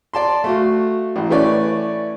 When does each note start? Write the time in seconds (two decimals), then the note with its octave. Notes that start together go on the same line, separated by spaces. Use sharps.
0.13 D5 A5 C6
0.44 A3 F#4 F5
1.16 A1
1.30 E3 A3 C#4 B4 C#5 D5